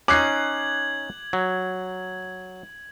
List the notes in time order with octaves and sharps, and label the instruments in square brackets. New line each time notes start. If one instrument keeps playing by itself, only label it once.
[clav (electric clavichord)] C#4 D#4 [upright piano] D6 F#6 C7 [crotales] G#6 F#7
[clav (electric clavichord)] F#3